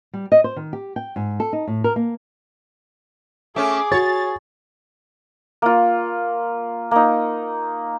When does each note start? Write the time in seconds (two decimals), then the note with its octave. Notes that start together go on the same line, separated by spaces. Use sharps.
0.14 G3
0.32 D#5
0.44 C5
0.56 D#3
0.73 G4
0.96 G5
1.16 G#2
1.40 A4
1.53 D#4
1.68 A2
1.84 A#4
1.96 A#3
3.56 A3 C#4 G#4 D6
3.92 F#4 C#5 A6
5.62 A#3 F4
6.91 A#3 D#4